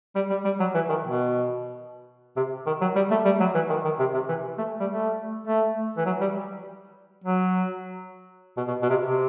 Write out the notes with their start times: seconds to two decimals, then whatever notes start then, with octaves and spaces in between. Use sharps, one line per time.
0.15 G3
0.30 G3
0.45 G3
0.60 F#3
0.74 E3
0.89 D#3
1.04 B2
2.37 C3
2.66 D#3
2.81 F#3
2.96 G3
3.11 A3
3.25 G3
3.40 F#3
3.55 E3
3.70 D#3
3.85 D#3
3.99 C3
4.14 C3
4.29 E3
4.58 A3
4.80 G3
4.92 A3
5.47 A3
5.97 E3
6.06 F#3
6.21 G3
7.24 F#3
8.57 B2
8.68 B2
8.82 B2
8.90 C3
9.02 C3